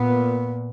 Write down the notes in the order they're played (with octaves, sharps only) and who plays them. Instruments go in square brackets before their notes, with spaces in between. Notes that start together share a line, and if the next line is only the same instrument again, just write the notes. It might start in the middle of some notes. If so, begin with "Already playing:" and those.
Already playing: [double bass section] A#2 B3